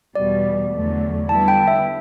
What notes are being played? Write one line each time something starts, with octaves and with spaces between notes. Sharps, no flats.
E2 B2 G3 D5
E2 D3 F#3 A3
D3 G3 B3 E4 A5
G5
E5